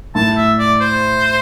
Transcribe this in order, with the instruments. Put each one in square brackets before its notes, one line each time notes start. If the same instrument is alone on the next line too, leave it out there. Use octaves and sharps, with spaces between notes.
[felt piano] A2 [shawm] A5
[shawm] E5
D5
C5